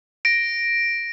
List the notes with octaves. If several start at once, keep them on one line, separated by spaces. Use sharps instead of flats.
A#6 D7